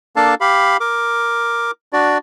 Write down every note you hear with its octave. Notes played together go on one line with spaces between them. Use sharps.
A#3 D4 A4 F5 A5
G4 F5 B5
A#4 D6
D4 F#4 D5